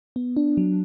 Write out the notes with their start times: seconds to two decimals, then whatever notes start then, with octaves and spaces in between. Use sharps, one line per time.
0.16 B3
0.37 D4
0.57 F#3